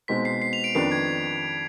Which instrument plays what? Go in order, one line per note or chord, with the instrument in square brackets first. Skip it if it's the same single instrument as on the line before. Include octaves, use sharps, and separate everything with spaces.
[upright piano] B2 G#3 C4 D#4 [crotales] B6
[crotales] C7
C7
F7
D7
[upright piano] F2 D#3 B3 D4 [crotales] C7
[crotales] G#6